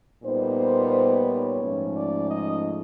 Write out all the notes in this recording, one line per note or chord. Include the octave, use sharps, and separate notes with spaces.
A#2 G3 B3 D#4 C5
C#5
G#2 F3 A3 C#4
D5
D#5